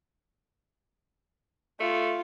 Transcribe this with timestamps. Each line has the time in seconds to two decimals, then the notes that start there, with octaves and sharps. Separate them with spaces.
1.80 A3 F4